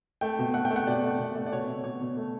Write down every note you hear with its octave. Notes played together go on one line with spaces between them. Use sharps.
A3 G5
B2
A3 F#5
G5
A3
F#5
B2 D5
A3
B2
A3
D5
B2 C#5
B2
B2 C#5
B2
A3